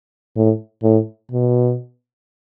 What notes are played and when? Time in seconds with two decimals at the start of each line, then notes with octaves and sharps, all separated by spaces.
0.36 A2
0.83 A2
1.32 B2